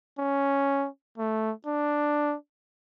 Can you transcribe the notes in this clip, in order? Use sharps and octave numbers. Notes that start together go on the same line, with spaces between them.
C#4
A3
D4